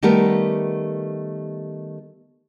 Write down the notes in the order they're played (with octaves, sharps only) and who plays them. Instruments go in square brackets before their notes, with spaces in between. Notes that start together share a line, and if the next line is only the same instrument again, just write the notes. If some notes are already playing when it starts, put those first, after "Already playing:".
[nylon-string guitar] D#3 G3 A3 B3 G4 A#4